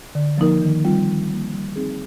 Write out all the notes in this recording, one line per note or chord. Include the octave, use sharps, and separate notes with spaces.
D3
F3 A#3 D#4 A#4
D#3
G3 C4 F4
D#3
G3 A#3
G3
C4 D#4 G#4